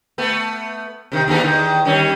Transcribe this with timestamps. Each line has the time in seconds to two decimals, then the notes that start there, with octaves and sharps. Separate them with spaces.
0.18 A3 B3
1.12 C3 D#3
1.28 D#2 D#4 A4
1.41 E2 D#3
1.85 D#3 G3 C#4